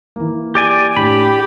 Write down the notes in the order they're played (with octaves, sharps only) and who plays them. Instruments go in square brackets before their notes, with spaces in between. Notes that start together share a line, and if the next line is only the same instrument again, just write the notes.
[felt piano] E3 A#3
[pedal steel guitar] G4 D5 G#5
[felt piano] A2 D4 [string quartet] G4 [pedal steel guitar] B5